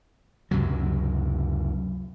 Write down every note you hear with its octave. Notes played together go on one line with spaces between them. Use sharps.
C#2 F#2 C3 F#3